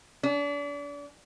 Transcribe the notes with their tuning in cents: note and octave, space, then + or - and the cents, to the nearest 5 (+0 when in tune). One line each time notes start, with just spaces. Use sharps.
D4 -35